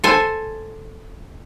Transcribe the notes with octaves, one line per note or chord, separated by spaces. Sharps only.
A4 C5 G#5